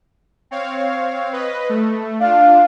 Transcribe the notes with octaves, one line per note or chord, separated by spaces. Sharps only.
C4 C#5 F5
B4 D#5
A3
D4 F4 F5